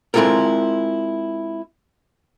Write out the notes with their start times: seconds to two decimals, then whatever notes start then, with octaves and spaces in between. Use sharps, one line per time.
0.14 G#3 C4 E4 F4 A4 A#4